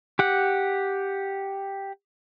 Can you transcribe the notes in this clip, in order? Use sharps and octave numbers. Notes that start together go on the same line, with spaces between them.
G4 F#5